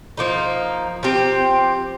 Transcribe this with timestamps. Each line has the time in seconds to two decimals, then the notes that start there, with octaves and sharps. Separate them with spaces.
0.17 F3 A#3 D#4
1.03 F3 C4 G4